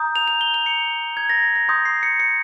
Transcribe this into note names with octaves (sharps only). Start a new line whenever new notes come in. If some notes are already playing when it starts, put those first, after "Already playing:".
Already playing: A#5 D#6 G6
F7
F7
G7
F7
C#7
G#6
A#6
A#6
C6 D#6 G6
C7
C#7
C#7